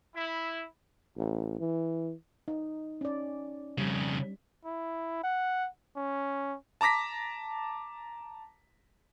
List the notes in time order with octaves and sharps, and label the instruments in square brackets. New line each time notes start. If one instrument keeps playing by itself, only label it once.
[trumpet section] E4
[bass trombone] A1
E3
[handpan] D#4
C#4 D5
[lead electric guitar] F2 C#3 [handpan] G3
[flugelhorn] E4
F#5
C#4
[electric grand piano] A5 A#5 D6 A#6 B6